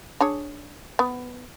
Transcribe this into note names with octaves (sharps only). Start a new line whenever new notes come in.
D4 G#4 C#5
B3